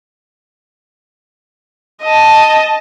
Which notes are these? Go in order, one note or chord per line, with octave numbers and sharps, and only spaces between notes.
D#5 A5